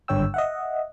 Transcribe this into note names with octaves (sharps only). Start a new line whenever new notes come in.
G#1 G2 D3 C#5 G5 E6
D#5 E5 F#5